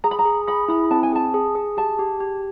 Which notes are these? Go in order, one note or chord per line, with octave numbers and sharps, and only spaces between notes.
G#4 A#5
B5
A#5
G#4
G#4 B5
E4 B5
C4 A5
G#5
G#4 A5
G#4
G#4
G4 A5
G4
G4